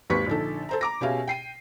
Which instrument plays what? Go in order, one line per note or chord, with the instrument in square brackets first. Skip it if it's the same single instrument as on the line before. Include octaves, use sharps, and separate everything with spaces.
[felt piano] G#1 D#2 G4 B4 C#6 B6
A#1 D3 D#4 A4
A4 C5 A#5
A#5 D6 A#6
B2 C#4 G4 G#4 E5 F5
G5 C7 D#7